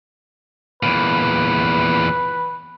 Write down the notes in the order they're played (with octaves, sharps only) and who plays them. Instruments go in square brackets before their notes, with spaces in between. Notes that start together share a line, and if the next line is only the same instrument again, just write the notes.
[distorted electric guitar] E2 A#2 [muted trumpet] B4